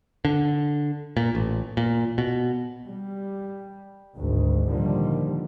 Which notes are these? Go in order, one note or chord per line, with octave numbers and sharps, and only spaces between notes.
D3
A#2
A1
A#2
B2
G3
G#1 D2
A#2 D3 D#3 F3 G3